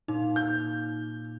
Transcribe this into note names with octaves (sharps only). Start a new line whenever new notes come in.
A#2 D#4
G6